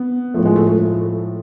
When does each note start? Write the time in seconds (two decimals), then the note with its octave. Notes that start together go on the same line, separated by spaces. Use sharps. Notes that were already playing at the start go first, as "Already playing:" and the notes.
Already playing: B3
0.34 A2 F3 A3
0.46 G#3
0.56 A3
0.67 A3